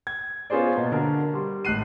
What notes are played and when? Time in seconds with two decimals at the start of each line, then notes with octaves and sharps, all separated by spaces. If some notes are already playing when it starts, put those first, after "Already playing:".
0.07 G#6
0.50 B3 C#4 F4 G#4 C5 D5
0.76 B2 A#3
0.92 D3 F#4 A#4
1.34 G3 C6
1.65 G#1 A2 F#6 C7 D#7